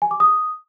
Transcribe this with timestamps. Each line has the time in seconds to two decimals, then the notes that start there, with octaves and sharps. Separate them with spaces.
0.02 G#5
0.11 D6
0.20 D#6